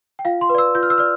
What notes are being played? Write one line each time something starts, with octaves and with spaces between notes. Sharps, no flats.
G5
F4 F5
C6
B4
D5 E6
F4 G6
F6
E6
D5 F6